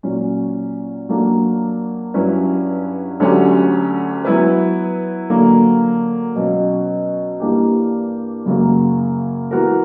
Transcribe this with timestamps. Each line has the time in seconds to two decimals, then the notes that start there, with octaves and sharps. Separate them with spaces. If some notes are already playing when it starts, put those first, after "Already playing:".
0.03 A#2 F#3 C#4
1.09 F#3 A#3 D4 F#4
2.14 G2 F#3 C#4 E4 B4
3.20 D2 D3 F#3 C#4 G4
4.25 F#3 B3 E4 B4
5.30 D3 F#3 A#3
6.36 B2 F#3 C#4
7.40 G2 E3 A#3 D4 G4
8.46 F#2 C#3 F#3 A#3
9.51 E3 B3 F#4 A#4